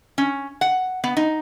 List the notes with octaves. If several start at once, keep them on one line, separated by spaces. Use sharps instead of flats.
C#4
F#5
B3
D#4